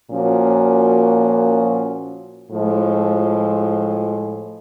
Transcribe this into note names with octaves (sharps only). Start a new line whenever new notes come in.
A#2 F3 A#3 C#4 F#4
A2 F3 G#3